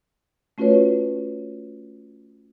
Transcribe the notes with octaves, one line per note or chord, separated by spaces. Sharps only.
A3 C#4 F4 F#4 B4 C#5